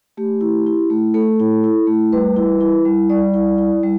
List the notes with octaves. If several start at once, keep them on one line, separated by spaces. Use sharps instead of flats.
A3 G4
E4
E4
A3
A3 A4
E4
E4
A3
G3 B4
E4
E4
G3
G3 D5
E4
E4
G3